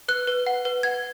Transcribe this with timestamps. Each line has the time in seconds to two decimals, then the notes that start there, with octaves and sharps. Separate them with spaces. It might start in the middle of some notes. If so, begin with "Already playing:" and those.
0.08 B4 F#6
0.27 B4
0.47 F#5
0.65 B4
0.83 F#5 G#6